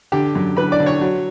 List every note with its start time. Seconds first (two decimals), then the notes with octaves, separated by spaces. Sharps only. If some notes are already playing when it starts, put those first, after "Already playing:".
0.12 D3 G4 G5
0.35 F#2
0.57 D3 B4 B5
0.72 D5 D6
0.80 D3
0.86 C#5 C#6
1.01 F#3